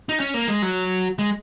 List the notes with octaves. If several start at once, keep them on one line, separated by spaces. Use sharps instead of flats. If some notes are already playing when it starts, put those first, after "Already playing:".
D#4
C#4
A#3
G#3
F#3
G#3